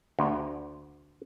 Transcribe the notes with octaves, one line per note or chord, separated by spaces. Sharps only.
D2